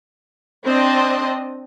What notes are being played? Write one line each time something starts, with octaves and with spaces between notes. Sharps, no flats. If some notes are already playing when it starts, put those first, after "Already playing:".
C4 D4 C5 D5 D#5